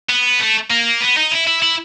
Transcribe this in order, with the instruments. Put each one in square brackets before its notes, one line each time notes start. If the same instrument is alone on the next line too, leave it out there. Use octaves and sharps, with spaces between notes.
[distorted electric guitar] B3
A3
A#3
B3
D#4
E4
E4
E4